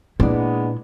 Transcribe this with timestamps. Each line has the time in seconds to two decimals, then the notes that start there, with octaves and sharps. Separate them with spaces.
0.20 A#2 G#3 A#3 B3 D4 E4